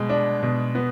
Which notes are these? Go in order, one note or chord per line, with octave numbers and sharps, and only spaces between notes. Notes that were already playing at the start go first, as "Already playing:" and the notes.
Already playing: B2 G#3
D4
B2
B3